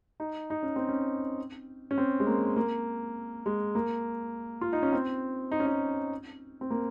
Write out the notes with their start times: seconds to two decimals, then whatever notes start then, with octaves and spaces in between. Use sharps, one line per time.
0.20 D#4
0.50 D#4
0.63 C#4
0.76 C4
0.89 C#4
1.91 C#4
1.98 C4
2.20 G#3
2.27 A#3
2.56 A#3
3.46 G#3
3.75 A#3
4.61 F4
4.73 D#4
4.83 C#4
4.93 C4
5.52 D#4
5.60 C#4
5.66 D#4
6.61 C4
6.70 A#3